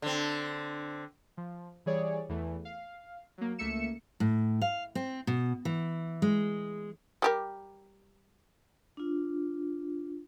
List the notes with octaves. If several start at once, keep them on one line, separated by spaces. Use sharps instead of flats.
D3 C4
F3
E3 G3 G#4 C#5 D5
E2 E3 A3
F5
F#3 A#3
C#2 A3 A#3 E5 C#7 E7
A2
F5
C4
B2
E3
G#3
G3 G4 A#4
D4 F4